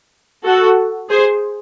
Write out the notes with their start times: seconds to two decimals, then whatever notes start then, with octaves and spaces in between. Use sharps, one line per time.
0.44 F#4 A4
1.10 G#4 C5